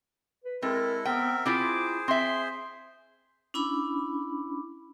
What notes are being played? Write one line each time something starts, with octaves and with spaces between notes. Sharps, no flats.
B4
G#3 C4 E4 A4 A#4
B3 C4 A#4 E5 G5
C4 E4 F4 G#4 C5 D6
C4 E5 C6
C#4 D4 E4 B5 D6